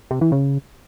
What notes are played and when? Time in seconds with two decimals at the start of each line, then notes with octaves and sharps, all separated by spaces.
0.11 C3
0.21 E3
0.32 C#3